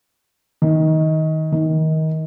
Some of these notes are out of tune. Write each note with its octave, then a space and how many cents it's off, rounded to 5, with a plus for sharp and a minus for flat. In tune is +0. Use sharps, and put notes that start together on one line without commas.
D#3 +20
D#3 +25